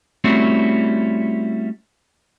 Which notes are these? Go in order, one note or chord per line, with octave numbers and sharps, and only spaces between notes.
G3 A3 C4 C#4 E4 F#4